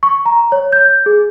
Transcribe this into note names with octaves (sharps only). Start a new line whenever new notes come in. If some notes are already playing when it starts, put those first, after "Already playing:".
C#6
A#5
C#5
G6
G#4